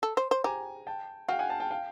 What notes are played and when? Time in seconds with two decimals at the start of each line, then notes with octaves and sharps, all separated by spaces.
0.03 A4
0.17 C5
0.31 C5
0.44 G4 G#5 A#5
0.87 G5 A5
1.28 F#4 F5 G5
1.39 F#5 G#5
1.49 G5 A5
1.60 G5 A5
1.71 F5 G5